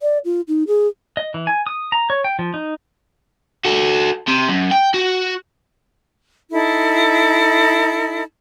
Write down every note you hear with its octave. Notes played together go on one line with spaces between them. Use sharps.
D5
F4
D#4
G#4
D#5
E3
G#5
D#6
A#5
C#5
G5
F3
D#4
F#4 A4
C3
F#2
G5
F#4
D#4 E4 A4